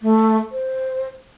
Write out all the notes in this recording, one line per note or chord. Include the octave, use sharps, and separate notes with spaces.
A3
C5